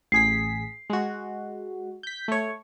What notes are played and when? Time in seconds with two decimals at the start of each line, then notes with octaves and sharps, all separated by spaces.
0.12 A1 G#4 B6 C7
0.90 G#3 F#4
2.03 G6 B6
2.28 A3 C#5